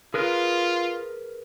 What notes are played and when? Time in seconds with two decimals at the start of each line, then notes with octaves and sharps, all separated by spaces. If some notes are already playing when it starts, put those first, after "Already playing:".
0.14 F4 G#4 A#4 B4